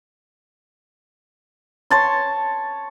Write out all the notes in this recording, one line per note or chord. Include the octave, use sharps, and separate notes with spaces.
C#5 A5 C6